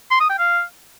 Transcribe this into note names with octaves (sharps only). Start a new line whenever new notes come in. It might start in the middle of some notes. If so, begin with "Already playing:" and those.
C6
D#6
G5
F5